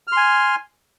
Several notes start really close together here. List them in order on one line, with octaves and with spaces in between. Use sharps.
F6 C6 G#5